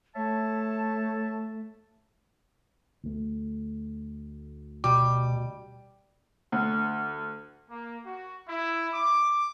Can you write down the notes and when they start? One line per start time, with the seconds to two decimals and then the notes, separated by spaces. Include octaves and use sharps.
0.16 A3 C#5 E5 A5
3.04 D2 A3
4.84 B2 G3 D6
6.52 D2
7.69 A#3
8.06 F#4
8.48 E4
8.93 D6